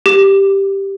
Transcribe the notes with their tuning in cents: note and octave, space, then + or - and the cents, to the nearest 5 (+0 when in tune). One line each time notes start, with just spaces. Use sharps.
G4 +0 D6 +25